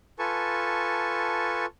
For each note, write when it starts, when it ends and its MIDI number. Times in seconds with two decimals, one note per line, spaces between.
0.19 1.66 65
0.19 1.66 69
0.19 1.66 71
0.19 1.66 80
0.19 1.66 81
0.19 1.66 85